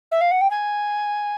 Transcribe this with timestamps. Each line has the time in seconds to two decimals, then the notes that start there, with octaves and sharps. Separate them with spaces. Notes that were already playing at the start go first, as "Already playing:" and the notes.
0.11 E5
0.20 F5
0.31 F#5
0.41 G5
0.50 G#5